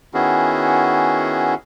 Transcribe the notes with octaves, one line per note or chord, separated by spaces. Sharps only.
D#3 B3 C#4 E4 F#4 G#4